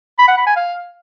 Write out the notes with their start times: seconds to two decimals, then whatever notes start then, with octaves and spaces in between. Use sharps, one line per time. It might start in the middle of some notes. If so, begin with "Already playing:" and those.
0.19 B5
0.28 F#5
0.37 B5
0.47 G#5
0.56 F5